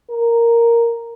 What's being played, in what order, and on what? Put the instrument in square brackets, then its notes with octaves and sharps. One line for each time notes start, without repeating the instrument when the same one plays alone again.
[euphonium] A#4